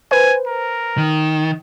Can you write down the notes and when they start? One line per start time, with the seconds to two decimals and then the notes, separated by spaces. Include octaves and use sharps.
0.11 B4 C5 G#5
0.47 A#4
0.98 D#3